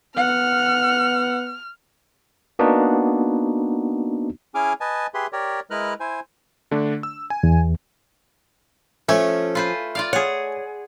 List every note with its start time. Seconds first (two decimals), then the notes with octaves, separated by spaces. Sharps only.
0.17 B3 F#5 F6
2.59 A#3 B3 D4 D#4 F#4
4.55 C#4 E4 G#4 G#5 D6 F6
4.81 B4 D#5 G#5 A5
5.14 G4 G#4 B4 E5 C6
5.33 G4 A#4 C#5 D5
5.71 G#3 E4 A#4 B4 F6 F#6
6.00 E4 C5 G#5
6.71 D3 A3 D4
7.03 E6
7.30 G#5
7.43 E2
9.09 F3 A3 C#4
9.55 F4 B4 C5
9.95 F4 D5 F5
10.13 G#4 C#5 F#5